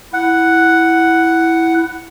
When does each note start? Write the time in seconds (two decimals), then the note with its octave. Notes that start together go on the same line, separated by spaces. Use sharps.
0.13 E4 F#5